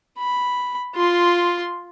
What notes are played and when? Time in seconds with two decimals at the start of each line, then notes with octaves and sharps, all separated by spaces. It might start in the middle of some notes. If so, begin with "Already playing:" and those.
0.19 B5
0.95 F4 C6